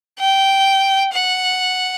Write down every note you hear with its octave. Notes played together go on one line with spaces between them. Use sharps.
G5
F#5